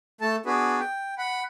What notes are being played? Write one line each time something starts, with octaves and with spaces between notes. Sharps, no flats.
A3 A4 A5
B3 D4 F#4 G#4 B4
G5
F#5 B5